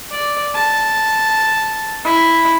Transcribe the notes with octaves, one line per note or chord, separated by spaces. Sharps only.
D5
A5
E4